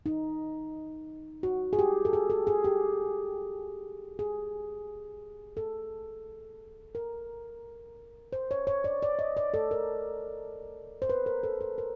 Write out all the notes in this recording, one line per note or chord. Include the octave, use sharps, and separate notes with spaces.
D#4
F#4
G#4
G4
A4
G#4
A4
G#4
G4
G#4
A4
A#4
C5
C#5
C#5
D5
D5
D#5
D5
A4
A#4
C5
B4
A#4
A4
A4
A#4